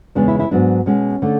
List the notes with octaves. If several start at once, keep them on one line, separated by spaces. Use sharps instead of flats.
E2 C#3 G#3 B3 D4
E4
E4
G#2 F#3 B3 D4
B2 G#3 B3 C#4
D3 A3